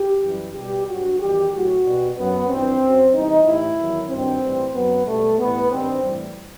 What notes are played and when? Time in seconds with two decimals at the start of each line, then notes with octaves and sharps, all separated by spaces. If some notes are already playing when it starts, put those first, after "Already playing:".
Already playing: G4
0.23 F#2 E3 G3
0.55 B2 G3 G4
0.87 G2 F#3 F#4
1.19 E2 D#3 G3 G4
1.52 A2 F#3 F#4
1.84 B2 G3
2.16 F#2 F#3 B3
2.49 G2 E3 G3 C4
2.81 F#2 F#3
3.12 E2 C3 E3 G3 D#4
3.44 A2 E3 G3 E4
3.77 E2 D#3 F#3
4.09 G2 D#3 F#3 C4
4.41 A2 E3 G3
4.74 F#2 F#3 B3
5.06 B2 G3 A3
5.38 A2 E3 G3 B3
5.71 G2 D#3 G3 C4
6.03 A2 E3 G3